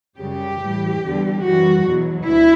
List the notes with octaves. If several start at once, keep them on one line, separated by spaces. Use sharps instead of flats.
F#2 C#3 G3 G4
A2 E3 G3
E2 D3 G3
F#2 E3 G3 F#4
E2 B2 F#3
D2 E4